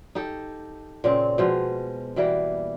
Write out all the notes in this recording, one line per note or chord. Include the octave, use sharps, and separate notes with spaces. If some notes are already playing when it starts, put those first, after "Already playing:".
D#4 G4 A4
A#2 C#3 C4
B2 F3 G#3
B2 E3 G3 A#3